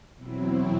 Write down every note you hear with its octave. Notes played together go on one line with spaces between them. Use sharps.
E2 B2 F#3 C4 E4